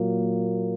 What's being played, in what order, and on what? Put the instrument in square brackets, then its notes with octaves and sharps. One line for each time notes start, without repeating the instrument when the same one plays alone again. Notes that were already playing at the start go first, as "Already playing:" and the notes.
Already playing: [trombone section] A#2 F#3 A#3